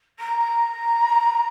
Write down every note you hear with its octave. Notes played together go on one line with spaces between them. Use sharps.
A#5